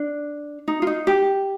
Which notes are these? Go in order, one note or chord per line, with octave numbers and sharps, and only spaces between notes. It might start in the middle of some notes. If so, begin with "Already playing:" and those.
Already playing: D4
D#4
F4
D#4
G4